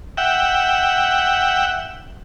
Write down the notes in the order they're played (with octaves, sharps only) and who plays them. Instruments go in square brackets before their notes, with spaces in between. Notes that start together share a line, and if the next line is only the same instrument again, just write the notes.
[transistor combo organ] E5 F#5 G5